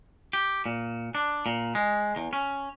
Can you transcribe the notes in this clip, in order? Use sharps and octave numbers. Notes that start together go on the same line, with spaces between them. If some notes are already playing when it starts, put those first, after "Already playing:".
G4
A#2
D4
A#2
G#3
E2
C#4